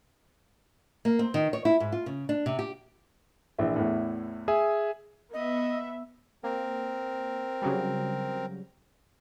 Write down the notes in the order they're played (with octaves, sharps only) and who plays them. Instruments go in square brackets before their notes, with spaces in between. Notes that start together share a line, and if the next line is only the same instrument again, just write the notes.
[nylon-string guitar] A#3
C4
D#3
C#5
E4
G#2
F4
C#3
D4
C3
G4
[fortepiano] A#1 E3 E5
E2 A2
[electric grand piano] G#4 E5 G#5
[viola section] B3 E5 [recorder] D#5
[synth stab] A#3 [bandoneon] C4 A#4
[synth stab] C#3 F#3 G3